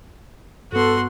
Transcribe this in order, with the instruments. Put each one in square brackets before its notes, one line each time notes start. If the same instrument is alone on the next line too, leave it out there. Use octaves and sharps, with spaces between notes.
[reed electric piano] G2 B3 [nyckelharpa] F#4 C6 [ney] A4